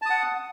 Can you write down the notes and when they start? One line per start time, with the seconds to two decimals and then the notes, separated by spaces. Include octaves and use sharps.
0.02 A5
0.06 D#6
0.10 F#5